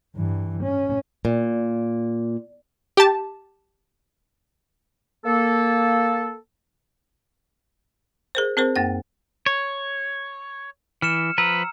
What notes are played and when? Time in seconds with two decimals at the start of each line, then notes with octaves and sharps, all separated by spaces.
0.16 G2 E3
0.63 C#4
1.25 A#2
2.97 G4 A5
5.26 A#3 A4
8.35 G#4 A#4 C5
8.57 C4 G#4 A#4 C5
8.76 F#2 A#3 F#5
9.46 C#5
11.02 E3 F6 C#7 E7
11.38 F3 B4 A#5 E6